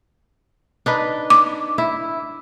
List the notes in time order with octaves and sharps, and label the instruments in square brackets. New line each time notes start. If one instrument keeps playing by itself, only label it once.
[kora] D4 D#4 B4
[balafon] D6
[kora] E4